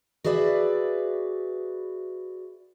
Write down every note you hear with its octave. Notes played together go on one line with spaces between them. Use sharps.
F#4 G#4 B4 D5 E5